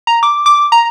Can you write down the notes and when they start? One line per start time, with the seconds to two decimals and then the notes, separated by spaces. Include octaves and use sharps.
0.07 A#5
0.23 D6
0.46 D6
0.72 A#5